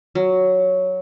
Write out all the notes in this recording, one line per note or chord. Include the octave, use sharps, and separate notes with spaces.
F#3